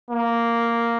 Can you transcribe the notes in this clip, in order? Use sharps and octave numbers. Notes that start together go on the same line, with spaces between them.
A#3